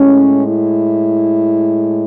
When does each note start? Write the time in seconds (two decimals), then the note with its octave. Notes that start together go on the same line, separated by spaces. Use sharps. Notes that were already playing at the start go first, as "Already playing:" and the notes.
Already playing: A2 G#3 C#4
0.46 E4